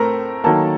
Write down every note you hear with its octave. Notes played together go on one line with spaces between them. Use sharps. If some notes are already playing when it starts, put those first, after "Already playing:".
Already playing: A2 A3 C4 A#4 A#5
D#3 F#3 A#3 A4 A5